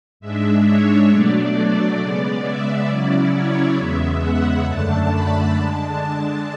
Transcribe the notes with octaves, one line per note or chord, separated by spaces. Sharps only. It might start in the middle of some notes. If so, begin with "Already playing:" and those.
G#2 G#3 D4 E5
C#5
B2 F#3 A3 D4 D5
D5
C#3 G#3 B3
E5
C#3 F#3 C#4 E4 D5
C#5
E2 C#3 G#3 B3 E5
F#5
F#2 D3 A3 D4 A5
B5
D3 G#3 D4 A5
A5